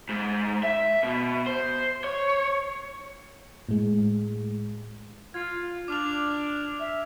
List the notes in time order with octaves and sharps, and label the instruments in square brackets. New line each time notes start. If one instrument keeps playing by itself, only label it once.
[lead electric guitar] G#2
E5
B2
C5
C#5
[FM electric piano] A2 G#3
[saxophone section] F4 [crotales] G#6
[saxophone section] D4 [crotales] D6 F6 F7
[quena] E5